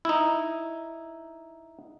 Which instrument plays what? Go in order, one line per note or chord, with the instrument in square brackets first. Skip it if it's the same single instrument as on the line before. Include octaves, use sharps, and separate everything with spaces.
[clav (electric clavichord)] D#4 E4